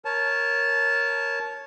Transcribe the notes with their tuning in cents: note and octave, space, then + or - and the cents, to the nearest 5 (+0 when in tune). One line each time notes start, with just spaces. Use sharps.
A#4 +0 C#5 +0 A5 -20